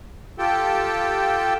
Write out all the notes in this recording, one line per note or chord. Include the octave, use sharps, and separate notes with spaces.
F4 G4 A4 G5 A5